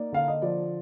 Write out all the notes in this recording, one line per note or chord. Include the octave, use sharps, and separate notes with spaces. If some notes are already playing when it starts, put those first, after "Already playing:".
Already playing: A#3 D#4 D5
D3 F5
D#5
F3 D5